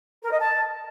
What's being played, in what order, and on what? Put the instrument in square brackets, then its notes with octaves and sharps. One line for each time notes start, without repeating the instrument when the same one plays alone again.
[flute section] A#4
D#5
A5